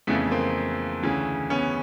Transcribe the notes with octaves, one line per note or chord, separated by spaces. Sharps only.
F2 C#3 E3 A3 B3
A#3 C4
D2 C#3 E3
B3 C#4